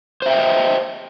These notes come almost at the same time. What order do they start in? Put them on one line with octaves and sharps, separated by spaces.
C5 E5 G5 D#5